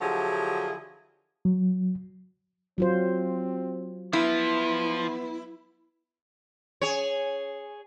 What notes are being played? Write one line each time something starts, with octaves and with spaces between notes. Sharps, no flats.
D3 F3 F#3 E4 G4 G#4
F#3
F#3 C4 F4 C5
F3 B3 E4
G#4 C#5